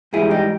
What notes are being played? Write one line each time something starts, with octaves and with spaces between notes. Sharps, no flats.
G#2 E3 G3 E4 G#4
D#4 G4